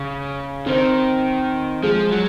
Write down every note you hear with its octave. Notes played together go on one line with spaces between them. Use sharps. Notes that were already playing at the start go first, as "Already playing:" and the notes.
Already playing: C#3
D#3 C4
F3 G#3
F#3